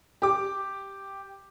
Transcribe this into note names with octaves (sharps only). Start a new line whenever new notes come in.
G4 D6